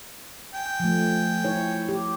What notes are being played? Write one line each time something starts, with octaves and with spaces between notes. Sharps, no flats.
G5 G#5
F3 A3
E4 C#5
G4